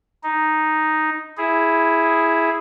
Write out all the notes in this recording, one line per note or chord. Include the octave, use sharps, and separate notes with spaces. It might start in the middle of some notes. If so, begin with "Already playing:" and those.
D#4
E4 G#4